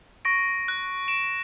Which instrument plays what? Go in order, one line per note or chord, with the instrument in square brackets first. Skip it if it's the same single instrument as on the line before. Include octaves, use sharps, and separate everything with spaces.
[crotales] C#6 A#6 D7
F#6
D7 E7